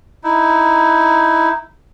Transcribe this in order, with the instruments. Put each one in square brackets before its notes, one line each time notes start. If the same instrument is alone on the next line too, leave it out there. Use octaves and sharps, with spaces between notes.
[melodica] D#4 E4